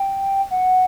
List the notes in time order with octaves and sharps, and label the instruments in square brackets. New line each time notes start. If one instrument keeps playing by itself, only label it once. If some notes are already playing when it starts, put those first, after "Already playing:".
Already playing: [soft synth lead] G5
F#5